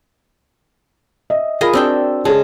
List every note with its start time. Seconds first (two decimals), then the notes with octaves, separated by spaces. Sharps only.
1.30 D#5 E5
1.61 F4 G#4 A#4 D#5 B5
1.73 C4 D4 F#4 G5 E6
2.25 C#3 G#3 G#4 A5